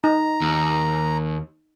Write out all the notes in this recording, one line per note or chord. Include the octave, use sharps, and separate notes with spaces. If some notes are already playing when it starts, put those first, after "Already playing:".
D#4 A#5
D#2